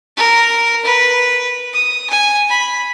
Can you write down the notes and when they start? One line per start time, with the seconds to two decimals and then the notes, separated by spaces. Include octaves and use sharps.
0.17 A#4
0.85 B4
1.73 D#6
2.10 G#5
2.49 B5